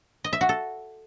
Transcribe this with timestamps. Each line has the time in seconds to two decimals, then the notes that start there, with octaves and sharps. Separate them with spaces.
0.24 D#5
0.33 E5
0.41 F#4
0.49 A4